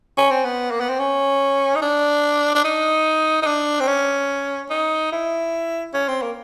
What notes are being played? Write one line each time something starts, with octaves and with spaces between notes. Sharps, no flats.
C#4
C4
B3
A#3
B3
C4
C#4
D#4
D4
D4
D#4
D#4
D4
C4
C#4
D#4
E4
C#4
C4
A#3